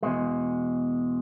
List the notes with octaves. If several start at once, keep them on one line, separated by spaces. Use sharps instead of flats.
E2 B2 G#3